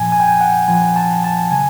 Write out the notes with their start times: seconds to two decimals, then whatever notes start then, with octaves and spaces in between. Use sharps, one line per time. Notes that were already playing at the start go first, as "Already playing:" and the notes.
Already playing: A#2 F3 G#5
0.12 G#5
0.20 G5
0.27 G#5
0.41 F#5
0.68 A#2 F3 G#5
0.96 A5
1.24 A5
1.51 C#3 F#3 G#5